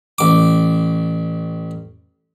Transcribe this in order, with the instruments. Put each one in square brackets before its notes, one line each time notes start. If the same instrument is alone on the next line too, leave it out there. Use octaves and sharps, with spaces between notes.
[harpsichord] A1 D6